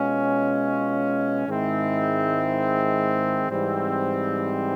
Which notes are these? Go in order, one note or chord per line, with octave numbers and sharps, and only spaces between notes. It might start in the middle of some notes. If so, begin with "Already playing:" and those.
Already playing: B2 G#3 C#4 F4
G#2 D#3 G#3 C4 E4
G#2 E3 G3 C4